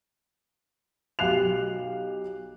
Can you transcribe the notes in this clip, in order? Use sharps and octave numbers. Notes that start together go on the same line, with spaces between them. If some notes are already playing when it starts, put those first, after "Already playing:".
B1 G4 F5 F#6 C7 F7